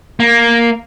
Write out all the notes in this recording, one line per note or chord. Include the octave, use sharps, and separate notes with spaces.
A#3